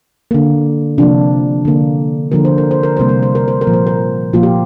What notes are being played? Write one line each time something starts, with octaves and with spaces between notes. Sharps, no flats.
D3 A#3
C3 F3 A#3 D4
D3 A#3
D3 F3 A#3 A#4
C5
A#4
C5
A#4
C3 G3 A#3 C5
A#4
C5
A#4
C5
A#4
A#2 F3 A#3
C5
A#4
A#2 F3 A#3 F4
G4